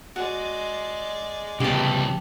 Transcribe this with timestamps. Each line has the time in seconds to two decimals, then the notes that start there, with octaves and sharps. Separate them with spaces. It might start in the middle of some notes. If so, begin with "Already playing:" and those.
0.16 G#3 F#4 D5
1.60 C2 C#3 B3 G4 A5